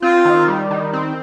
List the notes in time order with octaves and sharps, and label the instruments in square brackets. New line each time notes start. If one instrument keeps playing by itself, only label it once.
[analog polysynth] C4 [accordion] F4
[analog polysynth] D#3
G3
D#3
C4